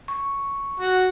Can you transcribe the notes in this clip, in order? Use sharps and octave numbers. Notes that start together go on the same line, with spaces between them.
C#6
F#4